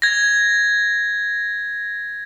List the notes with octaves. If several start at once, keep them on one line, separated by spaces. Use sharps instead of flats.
G#6 A#6